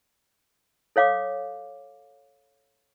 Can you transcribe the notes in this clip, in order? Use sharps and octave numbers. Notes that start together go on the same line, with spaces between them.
A4 C#5 F5 D6